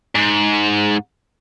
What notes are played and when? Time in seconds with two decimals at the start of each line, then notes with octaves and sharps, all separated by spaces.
0.15 G#2